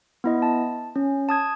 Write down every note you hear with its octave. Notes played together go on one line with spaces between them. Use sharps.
B3 E4 D#5
A5
C#4
A5 D#6 G#6